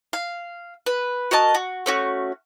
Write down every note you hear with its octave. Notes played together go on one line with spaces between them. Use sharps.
F5
B4
F#4 A#4 D#5 A5
F#4
A3 C#4 F#4